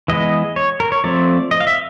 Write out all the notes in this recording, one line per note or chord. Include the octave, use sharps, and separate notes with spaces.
E3 G#3 B3 D#5
C#5
A#4
C#5
F3 A3 C4 D5
D#5
F5
E5